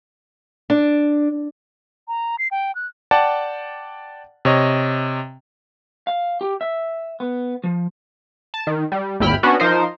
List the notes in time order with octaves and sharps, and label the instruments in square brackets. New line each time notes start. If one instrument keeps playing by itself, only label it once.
[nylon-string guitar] D4
[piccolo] A#5
C7
G5
F#6
[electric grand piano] D5 F#5 G5 A5
C3 C#5 D#5
[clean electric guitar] F5
G4
E5
B3
F3
[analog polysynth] A5
D#3
G3
G#1 D#2 E4 G5 B5 F6
B3 C#4 D4 F#4
F3 D#4 A#4 C5